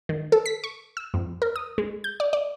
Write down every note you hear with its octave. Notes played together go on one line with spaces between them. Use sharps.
D#3
A4
B6
C#6
E6
F2
A#4
D#6
G#3
G6
D5
D5